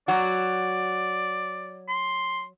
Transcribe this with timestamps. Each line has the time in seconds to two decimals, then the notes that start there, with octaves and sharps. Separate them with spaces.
0.08 F#3 F#4 D5
1.89 C6